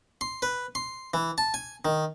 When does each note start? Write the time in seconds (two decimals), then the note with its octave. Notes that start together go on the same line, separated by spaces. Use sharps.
0.21 C6
0.42 B4
0.75 C6
1.14 E3
1.38 A5
1.54 G#5
1.85 D#3